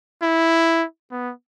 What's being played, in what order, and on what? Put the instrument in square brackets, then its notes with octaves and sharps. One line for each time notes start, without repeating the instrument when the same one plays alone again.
[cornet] E4
B3